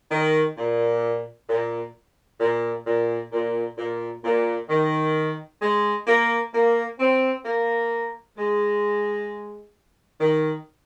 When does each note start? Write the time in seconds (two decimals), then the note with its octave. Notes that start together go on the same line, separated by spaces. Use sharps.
0.11 D#3
0.57 A#2
1.49 A#2
2.40 A#2
2.86 A#2
3.32 A#2
3.78 A#2
4.24 A#2
4.69 D#3
5.61 G#3
6.07 A#3
6.53 A#3
6.99 C4
7.45 A#3
8.36 G#3
10.20 D#3